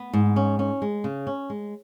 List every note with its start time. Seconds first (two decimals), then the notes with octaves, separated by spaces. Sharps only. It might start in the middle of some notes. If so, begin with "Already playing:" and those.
Already playing: B3
0.13 G#2
0.36 C#4
0.59 C#4
0.82 G#3
1.04 C#3
1.27 C#4
1.50 G#3